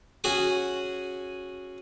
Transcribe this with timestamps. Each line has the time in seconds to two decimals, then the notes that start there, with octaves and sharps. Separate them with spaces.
0.24 C#4 F#4 G#4 F#5 G#5